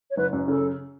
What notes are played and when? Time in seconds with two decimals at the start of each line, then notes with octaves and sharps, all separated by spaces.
0.11 C#5
0.17 F#1 B4
0.33 F#2
0.48 C#3 A4